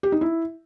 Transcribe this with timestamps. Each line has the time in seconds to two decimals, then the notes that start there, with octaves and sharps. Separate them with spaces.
0.03 G4
0.12 D#4
0.21 E4